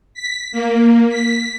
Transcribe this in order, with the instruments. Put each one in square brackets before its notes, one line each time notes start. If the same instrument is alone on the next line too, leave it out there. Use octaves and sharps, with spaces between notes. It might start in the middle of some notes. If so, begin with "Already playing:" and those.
[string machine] B6
A#3
B6